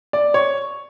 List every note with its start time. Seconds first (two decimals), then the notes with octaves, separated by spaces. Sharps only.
0.13 D5
0.34 C#5